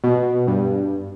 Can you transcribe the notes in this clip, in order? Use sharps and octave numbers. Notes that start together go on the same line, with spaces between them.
B2
G2